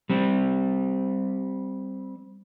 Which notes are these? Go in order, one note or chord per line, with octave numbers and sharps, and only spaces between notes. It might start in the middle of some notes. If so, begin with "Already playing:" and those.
G3 C4